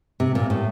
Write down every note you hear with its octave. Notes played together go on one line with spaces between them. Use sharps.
C3
A#2
A2